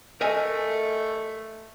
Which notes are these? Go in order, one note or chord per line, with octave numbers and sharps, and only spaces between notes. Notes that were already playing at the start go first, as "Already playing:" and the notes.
A3 A#4 D#5 G#5